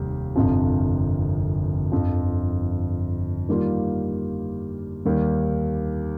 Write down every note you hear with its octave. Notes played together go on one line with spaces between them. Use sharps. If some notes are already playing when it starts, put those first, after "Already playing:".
Already playing: F1 D#2 G3
G1 F2 C3 F3
G1 F2 F3
D#3 G3 A#3 F4
D#2 D#3 G3 A#3